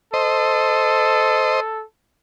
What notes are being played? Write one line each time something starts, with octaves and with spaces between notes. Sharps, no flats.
A4 C5 D#5